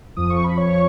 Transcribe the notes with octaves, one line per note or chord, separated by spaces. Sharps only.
F2 F3 D#6
C#6
B5
C#5 C#6